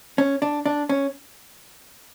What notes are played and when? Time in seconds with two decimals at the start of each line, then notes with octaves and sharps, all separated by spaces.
0.18 C#4
0.42 D4
0.66 D4
0.89 C#4